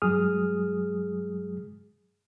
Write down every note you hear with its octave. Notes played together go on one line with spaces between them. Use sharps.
G2 F#3 G#3 G#4 D#6 F6